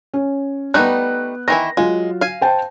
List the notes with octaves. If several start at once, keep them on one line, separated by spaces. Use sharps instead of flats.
C#4
G3 A3 B3 D#4 F#6
D#3 E3 E4 A#6
F#3 G#3 F4
F5 G#5
C5 G5 A5